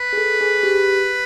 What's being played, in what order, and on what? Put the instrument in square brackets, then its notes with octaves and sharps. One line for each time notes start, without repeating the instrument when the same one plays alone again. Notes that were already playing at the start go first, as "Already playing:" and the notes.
Already playing: [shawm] B4
[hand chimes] G#4
A4
G#4
G4